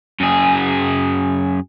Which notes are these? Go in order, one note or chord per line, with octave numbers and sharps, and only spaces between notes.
F#2 G#4